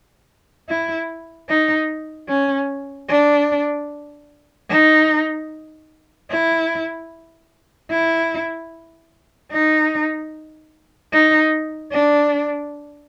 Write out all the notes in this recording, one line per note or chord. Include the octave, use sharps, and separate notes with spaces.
E4
D#4
C#4
D4
D#4
E4
E4
D#4
D#4
D4